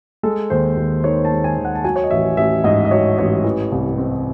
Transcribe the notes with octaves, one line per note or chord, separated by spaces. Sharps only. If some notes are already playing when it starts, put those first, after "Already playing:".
G#3 A4
D#2 C5
D#2
D#3 C#5
A5
G#3
G#5
D#2
F#5
A5
F#3 G#5
C#5
D#5
A1 E5
A1 E5
G#2 D#5
D#5
F#3 C#5
A1 C#5
E3
C2
C4